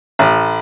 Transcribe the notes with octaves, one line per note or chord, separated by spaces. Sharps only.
A1